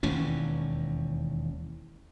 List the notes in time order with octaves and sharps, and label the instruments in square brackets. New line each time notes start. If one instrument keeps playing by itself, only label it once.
[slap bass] E1 D#2 E3 C#4